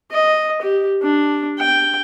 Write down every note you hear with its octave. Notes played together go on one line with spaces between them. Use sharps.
D#5
G4
D4
G5